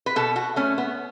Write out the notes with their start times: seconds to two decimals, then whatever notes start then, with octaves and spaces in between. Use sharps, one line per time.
0.06 B4
0.16 B2 A4
0.36 F#4
0.56 A3 C#4
0.78 B3